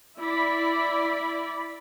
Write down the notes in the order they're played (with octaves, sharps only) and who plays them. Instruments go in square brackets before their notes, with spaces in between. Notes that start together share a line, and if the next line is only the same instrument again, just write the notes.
[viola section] E4 D5 B5